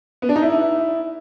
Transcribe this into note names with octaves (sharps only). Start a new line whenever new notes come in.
B3
D4
D#4
E4